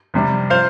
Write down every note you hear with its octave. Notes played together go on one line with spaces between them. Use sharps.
F2 C3 G3
F3 C5 F5